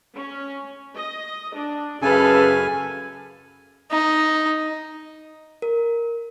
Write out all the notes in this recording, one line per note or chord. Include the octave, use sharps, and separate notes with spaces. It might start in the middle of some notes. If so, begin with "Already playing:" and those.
C#4
D#5
D4
F#2 C#3 G#4 A4 B4 F5 G#5
D#4
A#4